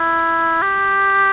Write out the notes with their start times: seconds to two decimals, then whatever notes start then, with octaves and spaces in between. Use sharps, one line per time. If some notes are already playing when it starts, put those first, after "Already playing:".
Already playing: E4
0.62 G4